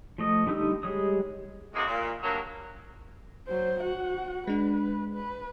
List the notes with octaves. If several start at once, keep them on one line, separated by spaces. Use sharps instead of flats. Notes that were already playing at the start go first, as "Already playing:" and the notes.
F3 A3 D#5
D3 G3 D#4 D#6 E6
G3 G#3 C#5 D#6
A2 C3 G#3 A#3 D#4 F#4
A#2
G2 F#3 A#3
F#3 C5
F#4 F#5
G#3 D4 B4
B4